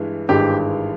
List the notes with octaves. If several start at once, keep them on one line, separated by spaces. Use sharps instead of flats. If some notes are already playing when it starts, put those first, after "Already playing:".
Already playing: G2 E3 G#3
G#1 G2 E3 G#3 G4